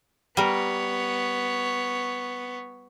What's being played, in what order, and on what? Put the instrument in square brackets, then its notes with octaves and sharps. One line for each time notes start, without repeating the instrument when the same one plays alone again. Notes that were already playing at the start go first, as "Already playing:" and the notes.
[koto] G3 A#4 [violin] B3 C#5